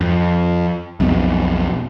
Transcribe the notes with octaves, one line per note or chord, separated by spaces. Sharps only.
F2
B1 F2 B2